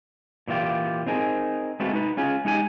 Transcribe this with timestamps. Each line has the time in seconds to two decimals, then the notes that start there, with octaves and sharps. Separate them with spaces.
0.48 A#2 E3 G3 F4 G4
1.07 C4 D#4 G#4 A#4
1.80 G#3 A3 C4 F4 F#4 B4
1.93 D#4 B4
2.17 C#4 F4 G#4
2.45 G#3 D#4 G4 G#5